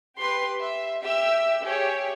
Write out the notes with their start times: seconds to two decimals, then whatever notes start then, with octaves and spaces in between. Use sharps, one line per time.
0.18 G4 B4 C6
0.61 E5
1.04 G4 E5 E6
1.65 G4 G#4 C#5